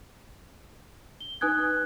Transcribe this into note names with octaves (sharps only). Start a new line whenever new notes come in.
G7
D#4 B4 G#5 D#6 F#6 G#6